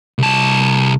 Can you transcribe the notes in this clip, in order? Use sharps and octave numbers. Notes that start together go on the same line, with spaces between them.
C2 A5